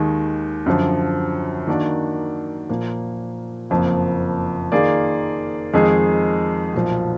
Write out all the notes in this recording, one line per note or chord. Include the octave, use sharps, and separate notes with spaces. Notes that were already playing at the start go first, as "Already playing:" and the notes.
Already playing: D#2 D#3 G#3
F#2 D3 F3
D#3 A#3 D4 F#4 D5
A#2 F3 A#3
F#1 F2 F3 A#3
D#3 A#3 F4 G#4 D5
F2 D#3 G#3 D#4 G#4
B1 A#2 F3